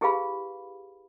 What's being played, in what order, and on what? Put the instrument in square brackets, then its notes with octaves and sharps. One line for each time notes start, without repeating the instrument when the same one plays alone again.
[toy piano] E4 G4 G#4 B4 F5 B5